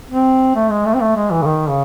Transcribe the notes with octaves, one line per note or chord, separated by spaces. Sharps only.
C4
A3
G#3
A3
C4
A3
G#3
E3
C#3
D#3
C#3